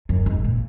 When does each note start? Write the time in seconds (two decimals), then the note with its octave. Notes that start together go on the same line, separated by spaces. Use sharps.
0.09 F#2
0.26 G#2
0.44 A#2